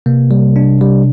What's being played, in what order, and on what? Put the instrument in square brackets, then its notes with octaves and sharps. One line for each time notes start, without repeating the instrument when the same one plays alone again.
[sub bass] C3 [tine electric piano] A#3
[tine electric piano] G3
D4
G3